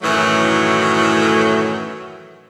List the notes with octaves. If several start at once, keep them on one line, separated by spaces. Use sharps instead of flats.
F#2 A2 D#3 E3 F#3 A3